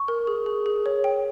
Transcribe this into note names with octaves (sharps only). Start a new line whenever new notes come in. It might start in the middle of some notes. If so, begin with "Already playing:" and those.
Already playing: C#6
A#4
G#4
G#4
G#4
C#5
G5